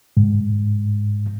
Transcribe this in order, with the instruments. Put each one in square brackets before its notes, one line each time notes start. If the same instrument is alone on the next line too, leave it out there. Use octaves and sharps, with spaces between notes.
[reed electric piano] G#2